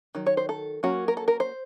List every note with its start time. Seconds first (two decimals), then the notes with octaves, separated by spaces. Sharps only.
0.15 D#3 F#3
0.27 C#5
0.37 C5
0.49 A4
0.83 F#3 A#3 C#4 F#4
1.08 A#4
1.17 A4
1.28 A#4
1.40 C5